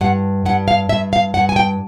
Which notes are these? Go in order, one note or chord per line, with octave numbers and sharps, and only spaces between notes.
G2 F#5
G2 F#5
F5
G2 E5
F5
G2 F#5
G#5
G5